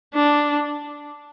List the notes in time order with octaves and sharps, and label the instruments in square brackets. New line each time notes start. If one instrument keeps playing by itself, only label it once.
[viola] D4